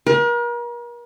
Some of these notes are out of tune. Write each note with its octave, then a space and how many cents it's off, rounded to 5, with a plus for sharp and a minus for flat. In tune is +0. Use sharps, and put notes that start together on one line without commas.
A#4 +40